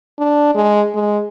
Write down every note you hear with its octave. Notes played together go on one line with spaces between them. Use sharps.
D4
G#3
G#3